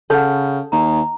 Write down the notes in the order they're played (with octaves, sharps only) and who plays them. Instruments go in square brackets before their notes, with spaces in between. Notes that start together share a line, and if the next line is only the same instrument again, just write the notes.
[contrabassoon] C#3 [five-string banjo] A4 [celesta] F#5 F6 G6
[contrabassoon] D#2 [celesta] A#5